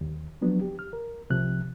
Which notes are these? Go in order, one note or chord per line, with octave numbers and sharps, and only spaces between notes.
D#2
F3 F#3 B3 D4
G4
F6
A#4
C2 C3 F3 F#6